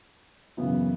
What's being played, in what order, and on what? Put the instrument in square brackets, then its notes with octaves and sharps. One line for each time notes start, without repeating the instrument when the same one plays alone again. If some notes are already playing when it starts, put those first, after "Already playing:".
[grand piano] F#2 C#3 E3 B3 E4